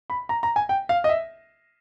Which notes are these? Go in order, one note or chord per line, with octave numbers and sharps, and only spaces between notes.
B5
A#5
A#5
G#5
G5
F5
D#5
E5